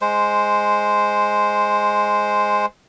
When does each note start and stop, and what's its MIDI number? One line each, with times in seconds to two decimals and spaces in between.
0.01 2.66 56
0.01 2.66 72